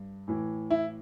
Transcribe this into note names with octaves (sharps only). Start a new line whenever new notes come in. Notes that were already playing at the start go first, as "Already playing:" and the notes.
Already playing: G2
A2 E3
E4